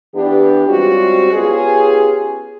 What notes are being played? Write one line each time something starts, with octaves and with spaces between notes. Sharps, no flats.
E3 B3 D4 G4
G3 G#3 C4 C#4 F4 F#4
B3 C#4 F4 G4 G#4